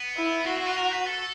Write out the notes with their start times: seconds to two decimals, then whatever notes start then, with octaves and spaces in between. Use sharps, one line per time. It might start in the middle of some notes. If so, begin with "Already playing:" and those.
Already playing: B3
0.17 E4
0.47 C4 F#4
0.57 E4
0.67 F4
0.77 A#4
0.92 B4
1.07 A4